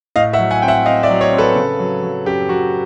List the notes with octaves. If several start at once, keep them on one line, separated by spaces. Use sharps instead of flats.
A2 D#5 F5
E5 F#5
F#3
F#5 G#5
C4 G5
E5 F#5
C4 D#5 F5
D5 E5
F#3
C#5 D#5
C4
A4 B4
C#3
F#3
F#3
F#2 G4
F#3 F#4